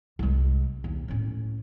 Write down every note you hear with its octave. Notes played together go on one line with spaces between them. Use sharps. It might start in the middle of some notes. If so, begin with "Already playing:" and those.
C2 G#3
D#2
A2 C#4